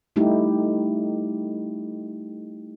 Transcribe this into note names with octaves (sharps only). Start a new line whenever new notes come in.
G3 A3 D#4 E4 G4